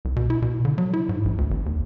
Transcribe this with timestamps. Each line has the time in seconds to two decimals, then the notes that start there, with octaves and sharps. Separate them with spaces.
0.05 C2
0.16 B2
0.30 E4
0.42 B2
0.65 D3
0.78 F#3
0.94 E4
1.09 G#2
1.25 A#1
1.38 D2
1.51 G#1
1.66 D#2